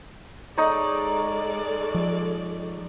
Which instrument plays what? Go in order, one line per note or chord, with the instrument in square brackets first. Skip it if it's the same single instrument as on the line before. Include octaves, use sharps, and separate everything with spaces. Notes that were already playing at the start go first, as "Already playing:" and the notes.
[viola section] G#3 A4 D5 [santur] D#4 C#5
[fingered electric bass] F3